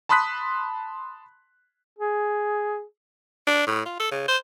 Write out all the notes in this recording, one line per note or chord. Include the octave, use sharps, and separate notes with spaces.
A5 B5 C6 D#6 F#6 B6
G#4
D4
A2
F4
A4
C#3
C5